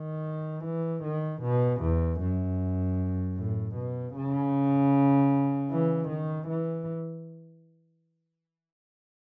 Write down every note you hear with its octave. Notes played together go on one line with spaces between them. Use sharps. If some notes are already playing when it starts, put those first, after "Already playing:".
Already playing: D#3
E3
D#3
B2
E2
F#2
A2
B2
C#3
E3
D#3
E3